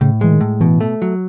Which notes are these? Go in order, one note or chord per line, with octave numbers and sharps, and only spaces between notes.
A2 C#3
E3 G#3
D#3
A2
B2 E3
A3
F#3